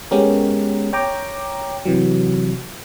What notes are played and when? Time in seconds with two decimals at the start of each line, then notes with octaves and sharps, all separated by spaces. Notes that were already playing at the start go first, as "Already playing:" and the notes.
0.11 G#3 B3 C#4 G4 A#4
0.93 C#5 G5 A#5 D6
1.85 C3 E3 F#3